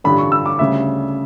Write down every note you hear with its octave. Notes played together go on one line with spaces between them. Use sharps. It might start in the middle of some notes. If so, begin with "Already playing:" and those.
A1 G2 D3 G3 B5
C#6
E6
D6
D2 C#3 G3 E5